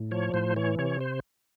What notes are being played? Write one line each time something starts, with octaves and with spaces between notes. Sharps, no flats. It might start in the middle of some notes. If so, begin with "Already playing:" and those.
Already playing: A2
F3 C#5
A2 C5
E3 C#5
C3 C#5
C5